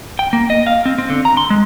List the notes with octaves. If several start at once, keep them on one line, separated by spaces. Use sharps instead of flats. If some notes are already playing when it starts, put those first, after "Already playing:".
G5
A#3
D#5
F5
C4
C4
D3
A#5
C6
G#3